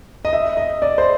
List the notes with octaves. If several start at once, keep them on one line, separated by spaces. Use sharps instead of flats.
D#5
E5
D#5
D5
C5